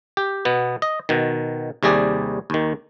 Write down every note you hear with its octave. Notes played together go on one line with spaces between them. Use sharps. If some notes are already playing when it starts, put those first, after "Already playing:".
G4
B2 B3
D#5
B2 D#3
D#2 C3 G3 G#4 D5
D#2 D#3